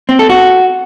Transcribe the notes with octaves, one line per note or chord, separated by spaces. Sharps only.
C4
A4
F#4